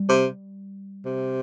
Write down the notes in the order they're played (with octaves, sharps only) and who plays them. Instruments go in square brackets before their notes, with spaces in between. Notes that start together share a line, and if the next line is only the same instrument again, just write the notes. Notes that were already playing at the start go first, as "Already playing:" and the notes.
Already playing: [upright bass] G3
[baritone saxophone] C3
C3